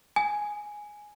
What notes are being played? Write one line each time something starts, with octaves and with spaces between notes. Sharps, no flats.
G#5